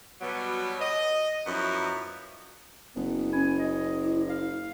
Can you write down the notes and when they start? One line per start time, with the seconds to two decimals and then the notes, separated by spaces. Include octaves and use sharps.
0.21 B2 F#3 G3 B3
0.81 D#5
1.46 F#2 F3 B3 D#4 E4
2.96 F#1 B3
3.33 C#4 G#5
3.59 D#5
4.05 E4
4.29 F5